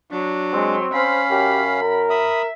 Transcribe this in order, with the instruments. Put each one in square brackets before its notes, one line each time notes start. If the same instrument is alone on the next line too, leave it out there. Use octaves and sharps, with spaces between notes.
[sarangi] F#3 [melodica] D4
[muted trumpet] G#3 [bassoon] C4
[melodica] C#4 F5 [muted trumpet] C5 [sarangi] B5
[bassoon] F#2 [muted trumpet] G4
[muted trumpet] A#4
[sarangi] E5 [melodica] B5 D#6